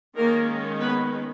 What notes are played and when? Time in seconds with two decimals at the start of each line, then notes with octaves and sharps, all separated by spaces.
0.16 D#3 G#3 A#3 C#4 A#4
0.80 B3 B4